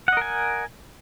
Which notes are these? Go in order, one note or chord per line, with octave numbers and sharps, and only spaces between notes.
A#4 D#5 F#5 G#5